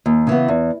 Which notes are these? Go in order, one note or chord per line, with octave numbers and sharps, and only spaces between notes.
D#2
C#3 E3 B3
E2